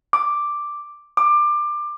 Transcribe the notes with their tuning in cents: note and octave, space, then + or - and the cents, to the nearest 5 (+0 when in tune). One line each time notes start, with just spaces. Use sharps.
D6 +5
D6 +20